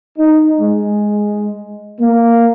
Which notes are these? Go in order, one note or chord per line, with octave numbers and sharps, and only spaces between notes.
D#4
G#3
A#3